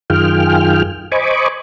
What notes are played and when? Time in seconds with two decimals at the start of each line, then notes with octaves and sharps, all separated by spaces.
0.10 F#2 D#3 F4 G#4 G5 F6
1.12 C5 D#5 G#5 B5 C#6 D6